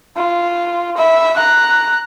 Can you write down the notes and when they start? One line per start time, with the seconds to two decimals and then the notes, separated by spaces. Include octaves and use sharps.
0.17 F4
0.97 E5 B5
1.37 A#5 F#6